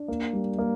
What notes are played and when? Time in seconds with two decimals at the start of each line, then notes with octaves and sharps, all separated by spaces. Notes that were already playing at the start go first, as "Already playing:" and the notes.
Already playing: D4
0.08 A#3
0.33 G3
0.58 A#3